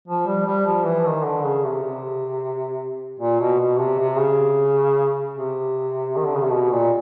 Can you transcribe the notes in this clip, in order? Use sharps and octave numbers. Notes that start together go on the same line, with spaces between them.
F3
G3
G3
F3
E3
D#3
D3
C#3
C3
C3
A#2
B2
B2
C3
C3
C#3
C3
D#3
D3
C#3
C3
B2
A#2